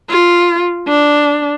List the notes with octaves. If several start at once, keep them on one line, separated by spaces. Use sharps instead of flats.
F4
D4